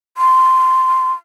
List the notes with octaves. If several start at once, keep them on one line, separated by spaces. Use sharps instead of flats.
C6